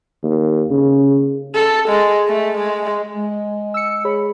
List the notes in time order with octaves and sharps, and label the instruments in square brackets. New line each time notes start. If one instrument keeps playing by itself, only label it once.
[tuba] D#2
C#3
[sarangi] A4
G#3
A3
G#3
[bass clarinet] G#3
[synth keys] E6 C#7
G#4 C#5 B5